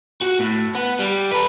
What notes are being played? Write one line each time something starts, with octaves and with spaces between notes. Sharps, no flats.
F#4
A2
B3
G3
A4 B4